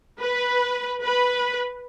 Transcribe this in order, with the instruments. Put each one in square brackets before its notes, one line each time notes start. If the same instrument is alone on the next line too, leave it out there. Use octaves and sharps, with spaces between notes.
[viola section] B4
B4